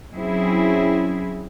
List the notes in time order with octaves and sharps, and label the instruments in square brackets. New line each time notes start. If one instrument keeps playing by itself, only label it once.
[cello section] F#3 C4 C#4 E4 G#4